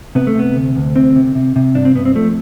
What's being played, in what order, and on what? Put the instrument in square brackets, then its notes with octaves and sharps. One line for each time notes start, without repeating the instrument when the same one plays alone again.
[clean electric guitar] C3 B3
A3
C3 B3
D2
D2
C3 C4
C3
C3
C3
G2 D4
C4
G2 B3
C4
F3 A3